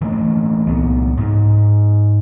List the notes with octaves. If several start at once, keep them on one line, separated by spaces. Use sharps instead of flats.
E3 A3 A#3
C2 B3
G#2